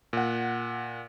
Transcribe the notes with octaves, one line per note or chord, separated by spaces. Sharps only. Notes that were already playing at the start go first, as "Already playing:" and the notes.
A#2 F#5